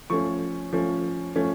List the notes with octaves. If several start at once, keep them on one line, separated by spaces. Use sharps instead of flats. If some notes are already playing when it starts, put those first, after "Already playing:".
F3 A3 C#4 C#6
F3 A3 C#4
F3 A3 C#4